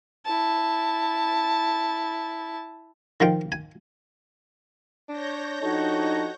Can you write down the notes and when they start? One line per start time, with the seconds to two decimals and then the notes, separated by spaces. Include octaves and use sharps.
0.25 E4 A5
3.20 D#3 F3 F4 G5
3.52 G#5
5.08 D4 C#5 G6 A#6
5.62 F3 D4 D#4 F#4 G4 A4 D#5